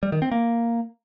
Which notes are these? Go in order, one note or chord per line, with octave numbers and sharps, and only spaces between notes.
G3
D#3
C4
A#3